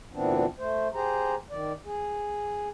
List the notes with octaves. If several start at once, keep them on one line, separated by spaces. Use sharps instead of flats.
D2 A#2 E3 B3 C4 D4
A3 C5
G4 G#4 C5 A#5
D#3 D5
G#4